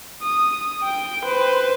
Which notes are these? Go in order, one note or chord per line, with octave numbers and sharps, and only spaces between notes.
D#6
G5 D7
B4 C5